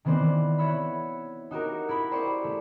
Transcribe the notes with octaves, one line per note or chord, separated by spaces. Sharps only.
D#3 E3 B3 C4 C5 D5
E4 F#4 C#5 E5 B5
D#4 F#4 G4 A#4
E4 A#4 B5
G4 C5 D5 G5 C#6
A3